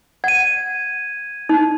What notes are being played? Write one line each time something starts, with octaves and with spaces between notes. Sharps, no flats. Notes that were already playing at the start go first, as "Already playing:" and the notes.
F#5 G#6 D#7
D#4